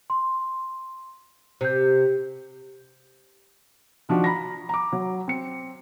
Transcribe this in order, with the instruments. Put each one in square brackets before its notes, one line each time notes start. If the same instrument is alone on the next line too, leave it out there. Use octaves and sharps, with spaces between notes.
[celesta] C6
[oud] C3 [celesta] C5 G6
[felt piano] D#3 F3 D4 F#4
A#5 B5 A#6
A#5 D6
F#3
C4 C#7